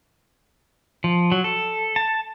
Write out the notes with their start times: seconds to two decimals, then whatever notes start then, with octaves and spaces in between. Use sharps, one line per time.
1.04 F3
1.32 F#3
1.44 A4
1.96 A5